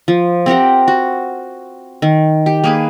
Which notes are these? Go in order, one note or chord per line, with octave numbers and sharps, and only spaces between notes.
F3
C4 G4 A#4 F#5
F#4
D#3
G4
A#3 G#4 B4